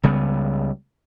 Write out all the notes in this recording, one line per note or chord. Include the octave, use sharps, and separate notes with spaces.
C#2 C#3 G3 B3